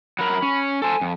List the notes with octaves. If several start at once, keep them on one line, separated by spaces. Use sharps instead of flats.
F#3 A#4 B5
C#4
A4 C5 G#5
F2